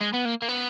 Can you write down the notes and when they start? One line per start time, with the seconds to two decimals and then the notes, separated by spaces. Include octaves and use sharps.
0.01 G#3
0.13 B3
0.25 A#3
0.42 A#3
0.49 B3